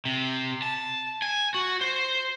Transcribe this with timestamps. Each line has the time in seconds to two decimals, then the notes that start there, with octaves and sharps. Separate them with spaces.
0.05 C3
0.62 A5
1.22 G#5
1.54 F#4
1.81 C5